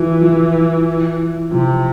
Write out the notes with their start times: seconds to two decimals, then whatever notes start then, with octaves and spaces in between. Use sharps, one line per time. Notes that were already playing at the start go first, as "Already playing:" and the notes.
Already playing: E3 F3
0.21 F3
1.52 C3 F3